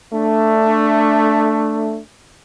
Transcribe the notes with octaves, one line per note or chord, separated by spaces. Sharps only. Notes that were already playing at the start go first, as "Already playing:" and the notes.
A3 D4